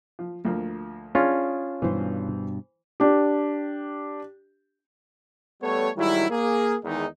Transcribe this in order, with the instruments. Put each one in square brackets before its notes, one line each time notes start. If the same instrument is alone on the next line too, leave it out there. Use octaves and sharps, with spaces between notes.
[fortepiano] F3
D2 F3 A#3
[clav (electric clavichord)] C#4 F4 [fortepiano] D4 G#4
[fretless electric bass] G2 B2 [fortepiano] E3 C5
[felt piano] D4 G4
[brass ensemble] G3 A3 B3 A4 C#5
G#2 D#3 F#3 G3 E4
A#3 G#4
E2 D#3 G#3 D#4